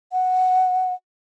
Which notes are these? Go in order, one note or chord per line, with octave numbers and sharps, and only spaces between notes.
F#5